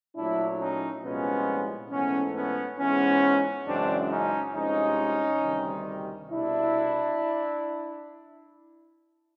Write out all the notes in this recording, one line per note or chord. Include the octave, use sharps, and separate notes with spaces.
A#2 F#3 A3 D4 E4
C#4 D#4
C2 A#2 F3 G#3 B3 C#4
G#2 E3 A3 B3 C#4
B3 C#4
G#2 E3 G#3 B3 C#4
F#2 C#3 E3 G#3 C4 D4
C#4 D#4
C2 C3 F3 G#3 C#4 D#4
D2 C3 D#3 G3
C2 B2 D4 E4